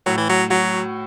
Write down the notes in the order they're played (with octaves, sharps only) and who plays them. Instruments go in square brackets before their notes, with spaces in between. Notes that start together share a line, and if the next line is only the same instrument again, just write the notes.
[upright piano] A2 [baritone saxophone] F#3
[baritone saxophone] E3
F#3
[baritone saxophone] F#3 [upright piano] F#4